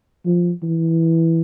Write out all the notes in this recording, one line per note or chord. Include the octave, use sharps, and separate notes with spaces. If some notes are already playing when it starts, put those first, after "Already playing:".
F3
E3